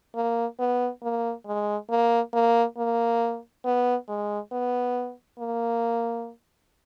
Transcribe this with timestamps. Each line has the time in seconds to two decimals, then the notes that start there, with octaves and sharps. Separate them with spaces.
0.15 A#3
0.59 B3
1.03 A#3
1.46 G#3
1.90 A#3
2.33 A#3
2.77 A#3
3.65 B3
4.09 G#3
4.52 B3
5.39 A#3